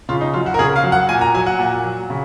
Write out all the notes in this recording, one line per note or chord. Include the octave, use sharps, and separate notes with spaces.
C#3 F4
D#4
F#3 F4
F#4
A#4
C#3 G#4
F5
F#3
F#5
A#2 G#5
A#5
F#3 G#5
F#5
A#2
F#3
C#3